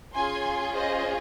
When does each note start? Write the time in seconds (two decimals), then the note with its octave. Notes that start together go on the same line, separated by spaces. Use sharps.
0.14 C#4 F4 G#4 G#5 C6
0.74 C5 D#5